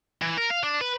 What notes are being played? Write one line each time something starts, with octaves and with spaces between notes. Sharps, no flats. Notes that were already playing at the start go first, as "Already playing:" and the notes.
E3
A#4
F5
D4
B4